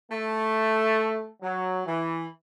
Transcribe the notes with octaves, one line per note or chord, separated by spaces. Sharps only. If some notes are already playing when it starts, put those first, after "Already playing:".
A3
F#3
E3